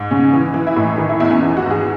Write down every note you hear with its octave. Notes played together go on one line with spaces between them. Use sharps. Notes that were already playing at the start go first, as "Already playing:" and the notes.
Already playing: G#2
C#3 C#4
E3
E3
E4
A2 D#4
D#3 D#4
E4
E2 E4
C#4
E3 D#4
F#4
G#2
G#4